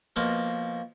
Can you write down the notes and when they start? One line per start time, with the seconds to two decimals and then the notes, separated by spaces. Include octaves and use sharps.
0.16 B2 F3 A#3